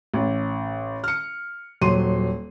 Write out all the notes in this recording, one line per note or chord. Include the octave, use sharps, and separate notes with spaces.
A1
F6 C#7
D#1 F#3 C6 D#7